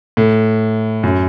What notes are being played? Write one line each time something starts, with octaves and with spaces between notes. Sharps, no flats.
A2
F#2